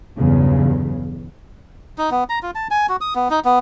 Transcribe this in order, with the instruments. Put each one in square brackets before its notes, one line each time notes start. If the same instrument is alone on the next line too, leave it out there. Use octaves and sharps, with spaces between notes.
[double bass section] B1 E2 G2 C#3
[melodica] D#4
B3
A#5
F4
A5
G#5
F#4
D#6
B3
D#4
B3